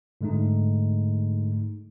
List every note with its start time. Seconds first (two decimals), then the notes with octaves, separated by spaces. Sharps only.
0.21 G#2 D3 G#3 A3 D#4